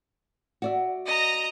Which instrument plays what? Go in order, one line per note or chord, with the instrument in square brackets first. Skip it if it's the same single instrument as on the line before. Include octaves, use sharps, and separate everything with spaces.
[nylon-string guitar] F#4 D5 E5
[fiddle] D#5 A#5